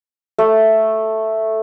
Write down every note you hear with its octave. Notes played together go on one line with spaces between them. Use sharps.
A3